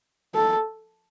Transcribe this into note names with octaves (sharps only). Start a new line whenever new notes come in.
A4